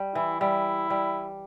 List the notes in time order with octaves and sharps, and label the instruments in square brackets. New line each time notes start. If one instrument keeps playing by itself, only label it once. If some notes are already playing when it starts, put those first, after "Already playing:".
Already playing: [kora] G3
[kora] E3 [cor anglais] E4
[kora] G3 [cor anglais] E4
[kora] G3